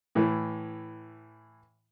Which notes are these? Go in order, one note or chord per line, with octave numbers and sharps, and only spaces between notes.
A2 E3